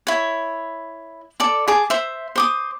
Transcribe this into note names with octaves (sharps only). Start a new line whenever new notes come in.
E4 C#5
A4 D5 D6
G#4 A5 D6
C5 E5
C5 D6 D#6